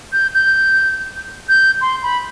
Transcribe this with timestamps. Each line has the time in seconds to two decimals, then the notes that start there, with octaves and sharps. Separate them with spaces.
0.13 G6
0.34 G6
1.49 G6
1.81 C6
2.03 B5